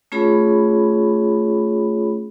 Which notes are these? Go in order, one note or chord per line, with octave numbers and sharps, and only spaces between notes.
A3 C#4 F4 G#4 C#5 B5